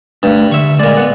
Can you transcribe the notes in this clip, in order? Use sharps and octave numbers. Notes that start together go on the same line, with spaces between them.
G2 G3 A3 D4
D3 E5 C#6
A#2 G#3 D5 D#5
B3 F#5